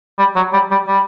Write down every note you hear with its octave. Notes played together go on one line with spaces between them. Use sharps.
G3
F#3
G3
G3
G3